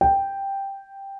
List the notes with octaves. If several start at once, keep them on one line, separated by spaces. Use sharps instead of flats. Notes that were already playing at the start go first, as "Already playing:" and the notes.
G5